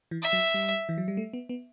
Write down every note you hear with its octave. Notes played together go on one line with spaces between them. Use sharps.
E3
E5
F#3
G3
E3
F#3
G3
A3
B3
B3